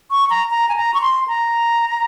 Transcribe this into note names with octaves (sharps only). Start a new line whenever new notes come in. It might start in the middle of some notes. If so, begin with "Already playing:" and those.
C#6
A#5
A#5
G#5
A#5
C#6
C6
A#5